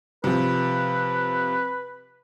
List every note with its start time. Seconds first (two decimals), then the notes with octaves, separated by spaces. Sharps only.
0.24 C3 F3 B4